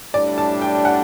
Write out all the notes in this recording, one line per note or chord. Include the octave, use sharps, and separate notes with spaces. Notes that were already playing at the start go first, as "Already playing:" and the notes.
A2 G3 D4 D5
A5
G5
F#5